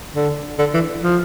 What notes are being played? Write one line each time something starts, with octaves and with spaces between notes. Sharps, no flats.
D3
D3
E3
F3